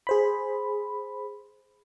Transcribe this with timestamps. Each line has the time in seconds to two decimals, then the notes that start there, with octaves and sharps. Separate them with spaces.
0.07 G#4 C5 B5